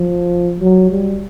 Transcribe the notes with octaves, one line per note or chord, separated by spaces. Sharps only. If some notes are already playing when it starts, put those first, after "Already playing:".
Already playing: F3
F#3
G3